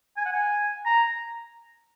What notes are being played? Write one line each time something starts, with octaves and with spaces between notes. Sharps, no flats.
G#5
F#5
G#5
A#5